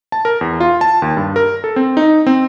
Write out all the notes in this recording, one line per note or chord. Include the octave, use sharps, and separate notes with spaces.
A5
A#4
E2
F4
A5
D#2
G2
A#4
A4
C4
D#4
C4